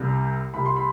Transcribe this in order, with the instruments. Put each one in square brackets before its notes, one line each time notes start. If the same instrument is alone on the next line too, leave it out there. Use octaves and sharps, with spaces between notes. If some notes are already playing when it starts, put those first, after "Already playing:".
Already playing: [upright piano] C2 C3 G3
C2 C3 G3 B5
C6
B5